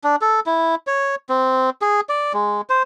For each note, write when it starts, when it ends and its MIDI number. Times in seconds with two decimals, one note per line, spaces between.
0.04 0.16 62
0.21 0.40 69
0.46 0.75 64
0.87 1.15 73
1.29 1.70 60
1.82 2.01 68
2.09 2.33 74
2.33 2.61 56
2.70 2.83 72